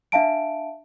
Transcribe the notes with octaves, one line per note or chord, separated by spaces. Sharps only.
D4 E5 F5 A5 D7